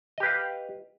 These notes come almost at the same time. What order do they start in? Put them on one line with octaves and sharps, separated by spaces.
D#5 G4 B4 F5